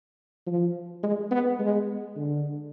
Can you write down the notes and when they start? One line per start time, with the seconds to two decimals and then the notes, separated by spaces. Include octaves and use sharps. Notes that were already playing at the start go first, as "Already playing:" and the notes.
0.47 F3
1.03 G#3
1.31 B3
1.59 G#3
2.16 D3